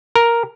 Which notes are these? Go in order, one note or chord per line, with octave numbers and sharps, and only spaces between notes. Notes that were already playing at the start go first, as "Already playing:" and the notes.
A#4